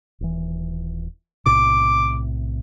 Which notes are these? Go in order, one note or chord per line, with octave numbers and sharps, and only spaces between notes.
D#1 E3
B1 A2 C3 D6